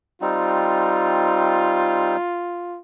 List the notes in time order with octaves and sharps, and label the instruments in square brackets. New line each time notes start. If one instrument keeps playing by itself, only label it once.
[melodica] G3 C4 D#4 [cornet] F4